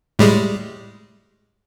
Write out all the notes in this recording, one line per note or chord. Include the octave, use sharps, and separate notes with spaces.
A2 G3 G#3